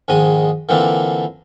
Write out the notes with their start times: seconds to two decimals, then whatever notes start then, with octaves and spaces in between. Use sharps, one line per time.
0.08 A#1 G#2 D#3 G#3 D#5 D#6
0.69 A#2 D3 E3 A#3 C4 D4